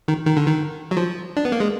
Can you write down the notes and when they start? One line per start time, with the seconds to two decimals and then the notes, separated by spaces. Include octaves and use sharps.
0.08 D#3
0.26 D#3
0.37 D3
0.47 D#3
0.91 F#3
0.97 F3
1.37 D4
1.45 B3
1.52 A#3
1.60 G#3